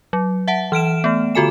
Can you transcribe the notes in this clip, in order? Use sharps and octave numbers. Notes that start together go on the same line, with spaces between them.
F#3
E5 F#5 A5
E3 F6 D7 E7
A3 B3
D3 F4 F#4 A4 G#5 E7